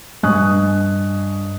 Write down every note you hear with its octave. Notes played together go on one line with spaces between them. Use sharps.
G2 D#5 G#5 C#6 D#6 F#6